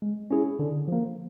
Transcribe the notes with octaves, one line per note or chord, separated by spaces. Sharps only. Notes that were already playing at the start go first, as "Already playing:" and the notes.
G#3
C#4 E4 G#4
D3
F3 A#3